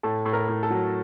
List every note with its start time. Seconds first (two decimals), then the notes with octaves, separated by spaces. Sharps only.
0.03 A2 A4
0.26 A2
0.33 A#4
0.48 A2
0.63 A4
0.70 F#3